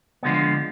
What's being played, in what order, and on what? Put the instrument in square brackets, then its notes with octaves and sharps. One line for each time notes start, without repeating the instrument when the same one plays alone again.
[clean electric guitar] D3 F3 G#3 B3